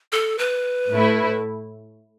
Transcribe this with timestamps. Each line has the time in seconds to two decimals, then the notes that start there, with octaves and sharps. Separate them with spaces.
0.12 A4
0.39 B4
0.90 A2 A3 E4